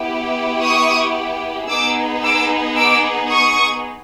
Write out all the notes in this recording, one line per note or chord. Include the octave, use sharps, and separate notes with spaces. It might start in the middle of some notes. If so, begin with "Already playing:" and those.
Already playing: B3 E4 G4
C#6 D#6
B3 D#4 G#4 D6 E6
D6 E6
D6 E6
C#6 D#6